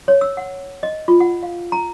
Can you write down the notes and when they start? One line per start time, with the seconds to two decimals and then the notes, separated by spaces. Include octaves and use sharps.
0.08 C#5
0.21 E6
0.37 F#5
0.83 D#5
1.08 F4
1.20 F#5
1.43 F5
1.72 A#5